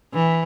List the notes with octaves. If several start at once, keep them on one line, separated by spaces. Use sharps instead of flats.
E3